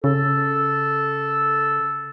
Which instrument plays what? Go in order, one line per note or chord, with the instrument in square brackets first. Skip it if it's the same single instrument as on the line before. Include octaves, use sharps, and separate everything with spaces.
[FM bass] C#3 [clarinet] A4